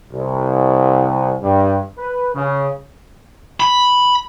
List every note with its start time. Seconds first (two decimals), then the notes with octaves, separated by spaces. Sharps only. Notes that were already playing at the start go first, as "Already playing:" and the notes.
0.12 C2
1.42 G2
1.98 B4
2.34 C#3
3.60 B5